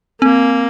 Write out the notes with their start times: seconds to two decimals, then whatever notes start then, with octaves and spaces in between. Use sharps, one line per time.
0.21 A#3 C4